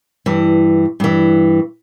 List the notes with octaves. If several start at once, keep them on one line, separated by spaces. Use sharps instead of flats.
G2 E3
G2 E3